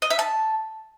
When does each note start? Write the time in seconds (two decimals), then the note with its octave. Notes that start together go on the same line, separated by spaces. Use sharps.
0.02 D#5
0.10 E5
0.19 A5